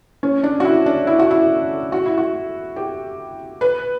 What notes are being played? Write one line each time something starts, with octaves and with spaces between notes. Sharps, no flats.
C#4
D4
F#4
E4
D4
E4
F#4
E4
F#4
E4
F#4
G4
B4